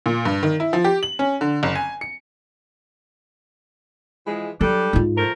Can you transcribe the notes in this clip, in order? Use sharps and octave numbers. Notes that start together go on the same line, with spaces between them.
A#2
G2
D#3
E4
F3
G4
F#7
C#4
D3
F#1
G#5
C#7
E3 F3 G#3
F#3 G3 D4 A4
G#2 F4
F3 A3 A#4